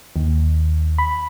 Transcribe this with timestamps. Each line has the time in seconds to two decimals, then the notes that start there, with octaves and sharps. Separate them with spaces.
0.16 D#2
0.98 B5